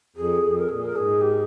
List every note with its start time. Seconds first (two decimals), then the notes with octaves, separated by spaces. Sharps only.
0.16 F2 G#4
0.43 F2
0.58 A#4
0.68 A#2 G#4
0.83 A#4
0.95 G#2 G#4
1.21 G4